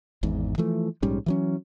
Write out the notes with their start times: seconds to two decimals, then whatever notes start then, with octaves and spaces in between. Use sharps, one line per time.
0.23 G#1 E2 G#2
0.58 E3 F3 A3
1.02 A#1 G#2 G3 C#4
1.26 E3 F#3 C#4